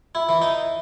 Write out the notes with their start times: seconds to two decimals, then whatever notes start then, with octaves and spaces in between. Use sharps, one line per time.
0.15 E4
0.29 E3
0.42 D#4